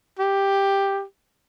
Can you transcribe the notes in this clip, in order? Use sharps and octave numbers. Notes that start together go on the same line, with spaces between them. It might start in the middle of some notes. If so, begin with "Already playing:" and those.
G4